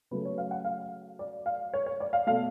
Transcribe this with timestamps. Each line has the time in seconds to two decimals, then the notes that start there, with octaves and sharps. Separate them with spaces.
0.11 C#3 F#3 A3 B4
0.25 C#5
0.38 F5
0.51 F#5
0.64 F5
1.19 D5
1.46 F5
1.74 C#5
1.86 C#5
2.00 D5
2.13 F5
2.27 B2 A3 F5